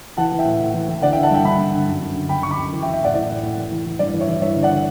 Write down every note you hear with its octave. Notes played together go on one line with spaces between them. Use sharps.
E3 F#5 A5
E3
E5 G5
A2
A2
E3
E3
D3 D5 F#5
E5 G5
D3
F#5 A5
G2 E5 G5
G2 G5 B5
G2
D3
F#2
F#2
D3
D3 G5 B5
D3 C#6
B5 D6
F#2
E3
E5 G5
E3
E5 G5
A2 D5 F#5
A2 D5
A2
A2
E3
E3
E3
G2 D5
E3
C#5 E5
E3
G2 C#5 E5
D3
D5 F#5
D3